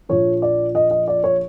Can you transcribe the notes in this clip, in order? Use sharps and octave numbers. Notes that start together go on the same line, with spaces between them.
A#1 A#2 F3 C#5
D5
D#5
D#5
D5
C#5